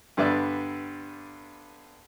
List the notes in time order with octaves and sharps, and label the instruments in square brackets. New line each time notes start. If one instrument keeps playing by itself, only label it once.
[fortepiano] G2 D3 B3 D5 E5